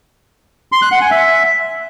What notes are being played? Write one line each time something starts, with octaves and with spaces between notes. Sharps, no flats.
C6
F#6
F#5
G#5
E5